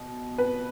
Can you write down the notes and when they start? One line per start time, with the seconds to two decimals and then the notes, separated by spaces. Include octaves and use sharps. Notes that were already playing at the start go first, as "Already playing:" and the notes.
Already playing: B2
0.38 B4